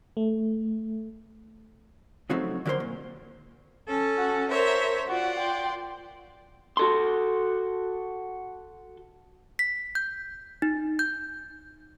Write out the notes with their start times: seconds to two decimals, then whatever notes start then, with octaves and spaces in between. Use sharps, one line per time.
0.17 A3
2.29 C#3 F3 F#3 A3 C4 D#4
2.66 D3 F#3 G4 A#4 C5 C6
2.80 A#2
3.87 C#4 A4
4.17 F#4
4.51 A#4 C5 C#5 E5
5.08 F4 F#4 D5 F#5
5.39 G5 C6
6.77 F#4 A4 C6
9.59 B6
9.95 G6
10.62 D#4
10.99 G6